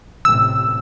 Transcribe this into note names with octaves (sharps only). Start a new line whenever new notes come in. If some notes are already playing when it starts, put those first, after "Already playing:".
A1 C3 E6